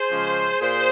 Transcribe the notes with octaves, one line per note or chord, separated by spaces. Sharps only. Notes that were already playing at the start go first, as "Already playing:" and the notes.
Already playing: G#4 C5
C#3 F3 G#3 C#4
A#2 G#4 C5